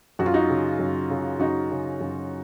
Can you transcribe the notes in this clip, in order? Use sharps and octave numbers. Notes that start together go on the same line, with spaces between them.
F#2 F#4
F4
D#4 F#4
C#3
F#2
C#3
F#2 D#4 F#4
C#3
F#2